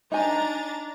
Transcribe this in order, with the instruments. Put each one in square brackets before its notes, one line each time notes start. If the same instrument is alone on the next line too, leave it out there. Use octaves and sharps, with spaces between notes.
[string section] D4 A#5 A6 [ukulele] D#4 G#5